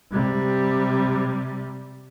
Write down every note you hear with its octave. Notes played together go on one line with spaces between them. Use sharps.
C3 G3